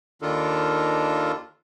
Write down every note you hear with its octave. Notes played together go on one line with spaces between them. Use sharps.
D#2 D#3 D4 F4 A4 A#4